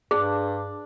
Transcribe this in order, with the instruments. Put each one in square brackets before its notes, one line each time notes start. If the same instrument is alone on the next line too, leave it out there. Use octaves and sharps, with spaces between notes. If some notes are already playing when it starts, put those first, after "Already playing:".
[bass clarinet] G2 [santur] D4 [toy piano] G#4